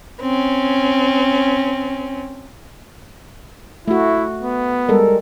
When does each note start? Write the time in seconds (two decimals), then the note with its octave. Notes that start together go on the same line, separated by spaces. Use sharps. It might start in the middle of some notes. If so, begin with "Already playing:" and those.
0.21 C4 C#4
3.88 A3 E4 F#4
4.42 B3
4.89 G3 G#3 A4 A#4